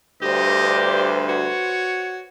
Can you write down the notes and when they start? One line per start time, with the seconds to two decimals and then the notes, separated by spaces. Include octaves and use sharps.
0.22 D2 G2 G4 B4 C5 D#5
1.29 F#4 C#5